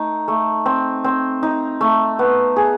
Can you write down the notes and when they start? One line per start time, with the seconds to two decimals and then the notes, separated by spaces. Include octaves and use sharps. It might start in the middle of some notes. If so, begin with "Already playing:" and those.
Already playing: A3 D#4
0.28 A3
0.66 C4
1.04 C4
1.43 D#4
1.81 A3
2.19 B3
2.56 G#4